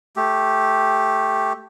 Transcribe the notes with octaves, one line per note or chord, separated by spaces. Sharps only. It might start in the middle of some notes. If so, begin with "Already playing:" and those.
A3 G4